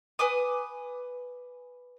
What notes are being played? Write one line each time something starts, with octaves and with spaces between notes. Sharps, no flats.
B4 G#5 D6 D#6